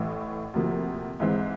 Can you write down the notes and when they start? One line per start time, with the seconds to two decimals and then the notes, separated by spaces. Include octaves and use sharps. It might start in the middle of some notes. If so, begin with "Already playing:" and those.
Already playing: A1 A2 E3
0.54 D2 C3 F3 A#3
1.20 G#2 E3 G#3 C4